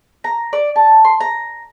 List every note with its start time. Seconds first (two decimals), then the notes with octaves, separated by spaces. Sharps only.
0.24 A#5
0.53 D5
0.76 A5
1.05 C6
1.21 A#5